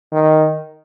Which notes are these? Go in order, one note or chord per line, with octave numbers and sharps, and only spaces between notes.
D#3